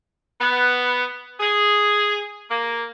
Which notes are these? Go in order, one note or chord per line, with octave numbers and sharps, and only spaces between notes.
B3
G#4
A#3